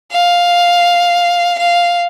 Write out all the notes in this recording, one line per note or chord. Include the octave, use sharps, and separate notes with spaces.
F5
F5